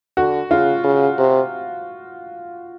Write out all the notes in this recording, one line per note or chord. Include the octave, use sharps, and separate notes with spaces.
D3 F#4
C#3 F4
C#3
C3